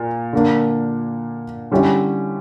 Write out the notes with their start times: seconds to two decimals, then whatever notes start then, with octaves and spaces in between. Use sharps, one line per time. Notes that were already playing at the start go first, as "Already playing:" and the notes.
Already playing: A#2
0.33 D3 A#3 D4
1.71 D3 G3 C#4 E4